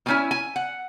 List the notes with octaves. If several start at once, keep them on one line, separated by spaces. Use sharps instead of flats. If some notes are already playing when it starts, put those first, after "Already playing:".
B2 A#3 C#4 E4 G#5
G#5
F#5